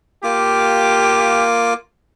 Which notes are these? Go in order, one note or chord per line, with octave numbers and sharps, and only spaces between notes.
A#3 F4 G4 D6